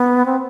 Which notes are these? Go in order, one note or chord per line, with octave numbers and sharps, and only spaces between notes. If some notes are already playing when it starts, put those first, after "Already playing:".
Already playing: B3
C4